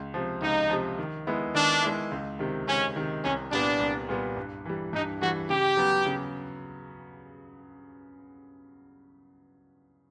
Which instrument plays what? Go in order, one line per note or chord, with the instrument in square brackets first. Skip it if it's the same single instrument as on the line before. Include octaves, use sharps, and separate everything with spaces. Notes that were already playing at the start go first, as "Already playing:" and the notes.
Already playing: [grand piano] C#2
C3 F3
[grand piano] C#2 [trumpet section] D#4
[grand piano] C3 F3
D#3
G#3 B3 E4
[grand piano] D#3 [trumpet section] D4
[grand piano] G#3 B3 E4
C#2
C3 D#3
[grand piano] C#2 [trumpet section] C#4
[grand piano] C3 D#3
[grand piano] C2 [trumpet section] C#4
[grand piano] A#2 G3 B3 [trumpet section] D4
[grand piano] C2
A#2 G3 B3
G2
E3 G3
[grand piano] G2 [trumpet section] D#4
[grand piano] E3 G3 [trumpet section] F#4
[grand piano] C#3 [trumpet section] G4
[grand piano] F#3 B3
C#3